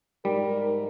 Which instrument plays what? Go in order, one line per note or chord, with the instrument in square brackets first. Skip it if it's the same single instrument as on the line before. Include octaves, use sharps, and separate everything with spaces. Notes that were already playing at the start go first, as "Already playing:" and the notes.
[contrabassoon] G#2 [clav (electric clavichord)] G3 [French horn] A#4